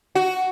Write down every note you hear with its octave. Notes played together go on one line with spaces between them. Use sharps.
F#4